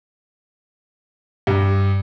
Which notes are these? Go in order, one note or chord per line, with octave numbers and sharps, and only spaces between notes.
G2